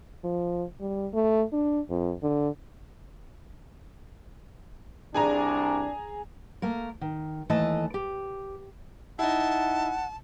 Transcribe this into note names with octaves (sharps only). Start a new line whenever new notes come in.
F3
G3
A3
D4
F2
D3
C2 D4 G#4 G#5 A#5
A3 A#3 A#4
D#3
D#2 E3 A3 A4 D#5 A5
G4
D#4 E4 F#5 A5